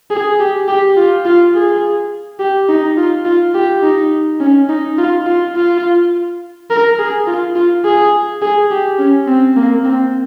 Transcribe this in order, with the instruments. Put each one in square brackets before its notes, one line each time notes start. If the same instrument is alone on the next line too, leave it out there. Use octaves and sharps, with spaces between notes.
[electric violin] G#4
G4
G4
F4
F4
G#4
G4
D#4
F4
F4
G4
D#4
C#4
D#4
F4
F4
F4
A#4
G#4
F4
F4
G#4
G#4
G4
C#4
C4
A#3
C4